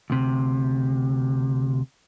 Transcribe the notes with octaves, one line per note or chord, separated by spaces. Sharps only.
D2 C3